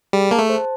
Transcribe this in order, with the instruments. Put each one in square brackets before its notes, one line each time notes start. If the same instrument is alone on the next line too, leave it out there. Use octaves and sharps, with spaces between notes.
[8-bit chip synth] G3 [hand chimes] G#4
[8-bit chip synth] A#3 [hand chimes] A5
[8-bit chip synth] A3
[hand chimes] C5